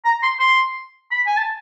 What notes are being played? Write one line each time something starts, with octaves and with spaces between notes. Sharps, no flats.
A#5
C6
C6
B5
G#5
A5